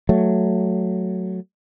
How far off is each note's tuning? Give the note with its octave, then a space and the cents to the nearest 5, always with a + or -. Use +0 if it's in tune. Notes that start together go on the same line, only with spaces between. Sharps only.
F#3 +0 A3 +0